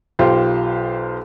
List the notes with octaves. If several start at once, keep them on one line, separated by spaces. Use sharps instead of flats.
B1 F4 G4 C5